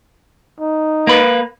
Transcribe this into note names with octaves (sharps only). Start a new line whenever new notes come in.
D#4
A#3 B4